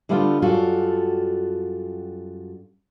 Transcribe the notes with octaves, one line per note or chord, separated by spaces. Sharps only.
D3 G3 A3 B3 F4
F#2 G3 F4 F#4 A4